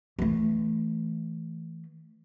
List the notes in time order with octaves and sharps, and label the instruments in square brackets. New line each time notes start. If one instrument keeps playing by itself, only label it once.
[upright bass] E3 A3